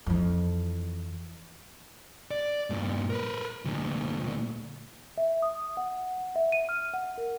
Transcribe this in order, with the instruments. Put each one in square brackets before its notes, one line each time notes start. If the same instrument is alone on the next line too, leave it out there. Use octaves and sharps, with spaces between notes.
[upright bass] F2 E3
[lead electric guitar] D5
G2 A#2
A#4 B4
D2 A#2
[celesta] E5
D#6
F#5
E5
D#7
F6
F#5
A#4